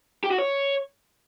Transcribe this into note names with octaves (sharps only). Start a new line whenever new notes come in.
G4
F#4
C#5